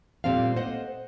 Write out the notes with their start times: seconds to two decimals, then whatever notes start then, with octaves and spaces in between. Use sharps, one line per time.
0.24 A#2 G3 C4 A4 F5
0.56 C5 D#5 F#5